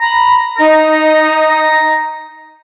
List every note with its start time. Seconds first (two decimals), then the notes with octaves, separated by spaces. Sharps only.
0.01 A#5 B5
0.58 D#4 A#5